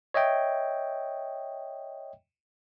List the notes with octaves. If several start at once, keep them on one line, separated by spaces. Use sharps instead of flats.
C#5 D#5 E5 G5